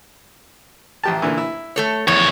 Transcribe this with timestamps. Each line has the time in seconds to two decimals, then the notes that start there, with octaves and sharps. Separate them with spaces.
1.04 A1 G4 A5
1.22 A#2 D3 E3
1.38 E4
1.76 A3 A4 C#5
2.08 E2 A2 F3 C#5